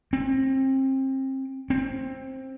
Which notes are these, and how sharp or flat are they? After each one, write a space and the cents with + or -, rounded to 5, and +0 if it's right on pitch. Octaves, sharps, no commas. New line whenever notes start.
C4 +30
C4 +15